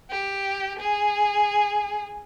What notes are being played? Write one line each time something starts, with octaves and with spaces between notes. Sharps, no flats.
G4
G#4